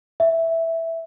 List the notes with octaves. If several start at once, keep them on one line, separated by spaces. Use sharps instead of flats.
E5